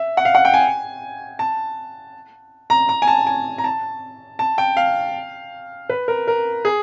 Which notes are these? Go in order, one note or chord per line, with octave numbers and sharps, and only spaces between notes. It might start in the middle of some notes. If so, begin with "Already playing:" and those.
Already playing: E5
F#5
F5
F#5
G5
G#5
A5
A#5
A#5
G#5
A5
G#5
A#5
A5
A5
G5
F5
B4
A#4
A#4
G#4